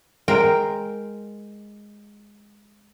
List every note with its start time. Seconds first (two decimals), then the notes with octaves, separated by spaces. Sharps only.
0.28 G#3 A#4 C5 G5